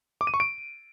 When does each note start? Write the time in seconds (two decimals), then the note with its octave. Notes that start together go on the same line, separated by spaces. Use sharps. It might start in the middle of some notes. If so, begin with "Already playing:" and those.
0.21 D6
0.27 D#7
0.34 C#6
0.40 D7